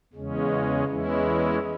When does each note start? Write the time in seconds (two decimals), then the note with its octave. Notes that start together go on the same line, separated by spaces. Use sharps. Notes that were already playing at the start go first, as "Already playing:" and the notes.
0.13 E2 C#3 G#3 C#4
0.87 E2 E3 G#3 C#4 E4